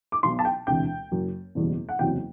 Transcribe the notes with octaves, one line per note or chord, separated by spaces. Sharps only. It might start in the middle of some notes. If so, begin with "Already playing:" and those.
D6
B1 B2 F#3 C6
A5
G5
E1 D2 C3 E3 G5
F#1 F#2 F#3
F#1 E2 B2 G3
F#5
F#1 E2 C3 F#3 G5